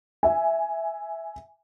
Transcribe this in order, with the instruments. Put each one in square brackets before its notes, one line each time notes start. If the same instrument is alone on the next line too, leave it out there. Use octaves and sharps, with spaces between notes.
[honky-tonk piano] E5 G#5